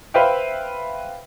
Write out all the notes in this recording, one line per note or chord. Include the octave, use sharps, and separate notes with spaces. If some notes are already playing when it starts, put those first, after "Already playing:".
B4 C5 E5 F5 G5